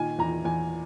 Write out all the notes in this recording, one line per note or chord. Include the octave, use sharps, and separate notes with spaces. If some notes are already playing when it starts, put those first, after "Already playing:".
Already playing: A#2 D#3 G#5
E2 A#5
E2 G#5